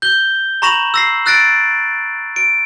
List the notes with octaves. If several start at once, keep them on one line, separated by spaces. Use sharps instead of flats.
G6 G7
A#5 B5 C#6 A#6 E7 F#7
E6 A#6 C7
E6 F#6 A6 A#6 D7
D7